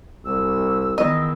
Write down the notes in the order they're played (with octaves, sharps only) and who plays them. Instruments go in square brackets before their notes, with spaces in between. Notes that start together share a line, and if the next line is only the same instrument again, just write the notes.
[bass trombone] C2 [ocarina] E6
[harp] E2 D#3 [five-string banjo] D#5